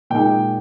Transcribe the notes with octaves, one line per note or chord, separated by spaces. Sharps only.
A#2 G#3 D#4 G5